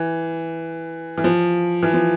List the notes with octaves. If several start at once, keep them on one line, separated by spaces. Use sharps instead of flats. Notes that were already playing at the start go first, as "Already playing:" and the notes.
Already playing: E3
E3
F3
E3
F3